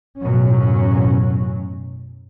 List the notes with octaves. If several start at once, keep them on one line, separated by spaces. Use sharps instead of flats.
A1 F#2 B2 F#3 C#4